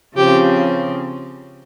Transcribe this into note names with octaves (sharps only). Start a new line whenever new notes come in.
C#3 F3 C4 G4